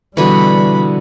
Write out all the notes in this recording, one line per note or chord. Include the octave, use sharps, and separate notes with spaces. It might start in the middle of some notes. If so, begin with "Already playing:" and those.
B2 D3 E3 G3 B5